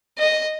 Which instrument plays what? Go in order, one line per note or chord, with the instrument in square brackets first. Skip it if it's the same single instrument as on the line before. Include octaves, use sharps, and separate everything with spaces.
[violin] D#5